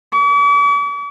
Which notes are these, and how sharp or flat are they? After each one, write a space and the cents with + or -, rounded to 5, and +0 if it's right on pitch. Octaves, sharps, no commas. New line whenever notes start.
D6 -45